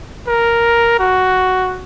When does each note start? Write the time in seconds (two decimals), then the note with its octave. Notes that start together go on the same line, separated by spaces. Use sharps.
0.27 A#4
0.99 F#4